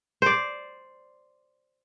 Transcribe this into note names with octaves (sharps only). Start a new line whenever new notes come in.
C5 D5